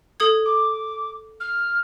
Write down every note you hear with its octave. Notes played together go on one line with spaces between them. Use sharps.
A4 D#6 G#6
D6
F6